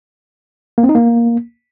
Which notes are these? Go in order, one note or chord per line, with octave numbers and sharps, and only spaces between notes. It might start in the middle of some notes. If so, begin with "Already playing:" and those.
A#3
C4
D#4
A#3